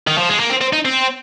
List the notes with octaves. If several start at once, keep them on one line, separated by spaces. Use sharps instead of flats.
D#3
F3
G#3
A#3
C4
C4
D#4
C4